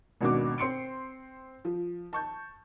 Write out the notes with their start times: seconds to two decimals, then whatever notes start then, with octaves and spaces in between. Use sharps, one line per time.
0.21 G#1 D#2 B2 D4 F#4 D6
0.58 C4 C6 C#7 D7
1.65 F3
2.13 A5 C#6 G6